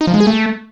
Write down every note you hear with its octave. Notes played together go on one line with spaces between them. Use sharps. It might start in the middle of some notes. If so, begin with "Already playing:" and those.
D#4
F3
G#3
G#4
A3